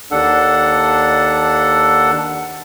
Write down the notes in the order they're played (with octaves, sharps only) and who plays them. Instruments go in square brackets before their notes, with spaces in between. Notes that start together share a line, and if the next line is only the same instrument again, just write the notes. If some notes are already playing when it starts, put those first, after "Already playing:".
[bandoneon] D#2 D4 A4 F#5